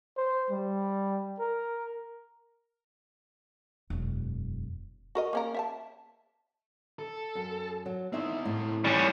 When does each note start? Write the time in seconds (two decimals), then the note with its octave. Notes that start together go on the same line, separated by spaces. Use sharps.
0.17 C5
0.51 G3
1.40 A#4
3.90 E1 F#2
5.15 F#4 A#4 D#5
5.33 A#3 C#4 A#4
5.54 E5 F5 A5
6.99 A4
7.35 F#2
7.86 F#3
8.13 E2 C4 D#4 E4 E5
8.45 A2
8.84 G2 E3 G3 C#4